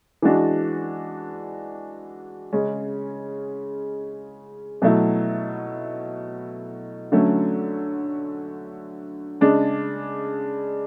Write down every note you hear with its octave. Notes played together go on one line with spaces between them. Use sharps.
E3 G#3 D4 F#4
C#3 G#3 C#4
B2 F#3 A3 E4
D3 F#3 A3 C#4
C#3 G#3 D4